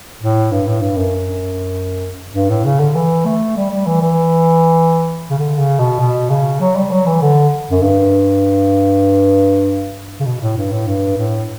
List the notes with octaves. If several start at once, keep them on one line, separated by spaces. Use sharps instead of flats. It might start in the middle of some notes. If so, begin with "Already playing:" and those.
A2
G2
A2
G2
F#2
G2
A2
C#3
D3
E3
A3
G3
G3
E3
E3
C#3
D3
C#3
B2
B2
C#3
F#3
G3
F#3
E3
D3
F#2
G2
C#3
B2
A2
G2
A2
G2
A2